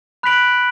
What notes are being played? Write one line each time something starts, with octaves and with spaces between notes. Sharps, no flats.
B5 F#6 B6 D7 F#7